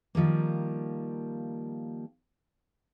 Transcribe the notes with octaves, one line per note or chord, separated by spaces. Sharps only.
D#3 F3 G3 A#3